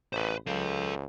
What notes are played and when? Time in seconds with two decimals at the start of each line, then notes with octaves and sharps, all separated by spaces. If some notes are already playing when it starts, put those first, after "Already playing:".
0.13 A1 B4 C5
0.47 C#2 A4 F5